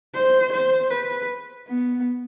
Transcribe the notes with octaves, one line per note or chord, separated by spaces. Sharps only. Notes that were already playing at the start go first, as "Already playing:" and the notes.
C5
C5
B4
B3